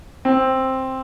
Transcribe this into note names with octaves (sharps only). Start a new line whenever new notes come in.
C4